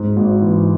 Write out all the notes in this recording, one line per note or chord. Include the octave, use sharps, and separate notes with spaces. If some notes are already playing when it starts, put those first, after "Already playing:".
Already playing: G#2
G#1
E3